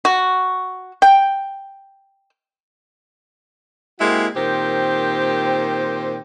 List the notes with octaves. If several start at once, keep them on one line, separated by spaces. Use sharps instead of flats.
F#4
G5
G#3 A#3 C4 E4 F#4 G4
A#2 D#3 C4 G4 C5